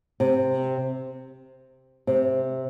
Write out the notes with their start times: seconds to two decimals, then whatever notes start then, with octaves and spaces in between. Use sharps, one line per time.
0.20 C3
2.07 C3